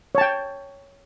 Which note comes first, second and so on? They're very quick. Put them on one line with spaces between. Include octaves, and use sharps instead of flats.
C#5 A5 G5